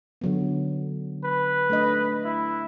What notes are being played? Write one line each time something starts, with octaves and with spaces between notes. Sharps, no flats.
D3 F#3 B3
B4
A3 D4 D#5
E4